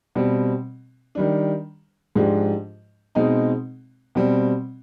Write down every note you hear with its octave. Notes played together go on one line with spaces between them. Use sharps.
B2 G3 C4
D#3 G3 D4
G#2 F3 G#3 D4 G4
B2 G#3 C4 D#4
B2 G3 C4